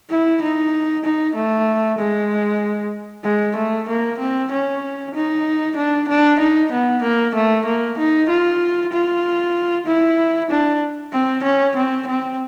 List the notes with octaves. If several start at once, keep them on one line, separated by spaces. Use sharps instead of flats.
E4
D#4
D#4
A3
G#3
G#3
A3
A#3
C4
C#4
D#4
D4
D4
D#4
B3
A#3
A3
A#3
D#4
F4
F4
E4
D4
C4
C#4
C4
C4